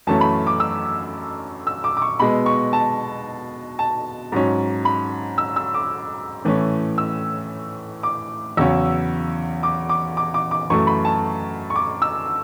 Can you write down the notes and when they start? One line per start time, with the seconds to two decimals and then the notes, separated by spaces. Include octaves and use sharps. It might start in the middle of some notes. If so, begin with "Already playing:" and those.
0.07 F#2 E3 A3 C#4 A5
0.21 B5
0.47 D6
0.60 E6
1.67 E6
1.84 D6
1.97 D6
2.02 C#6
2.19 B2 G#3 B3 B5
2.46 C#6
2.73 A5
3.79 A5
4.32 G#2 F#3 C#4
4.85 B5
5.38 E6
5.56 E6
5.74 D6
6.45 A2 E3 A3 C#4
6.98 E6
8.03 D6
8.57 E2 C#3 F#3 C#4 E6
9.63 D6
9.89 D6
10.17 D6
10.34 D6
10.51 D6
10.70 F#2 E3 A3 C#6
10.87 B5
11.05 A5
11.70 C#6
11.76 D6
12.02 E6